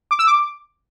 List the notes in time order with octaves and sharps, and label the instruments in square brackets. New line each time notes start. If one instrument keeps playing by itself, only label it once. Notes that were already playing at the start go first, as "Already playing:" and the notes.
[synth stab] D6
E6
D6